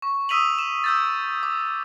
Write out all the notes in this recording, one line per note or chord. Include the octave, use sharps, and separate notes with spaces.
C#6
D#6 E6 B6 D#7 F7 F#7
E7
E6 G6 A6
D6